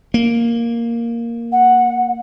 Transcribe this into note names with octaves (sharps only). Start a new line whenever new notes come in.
A#3
F#5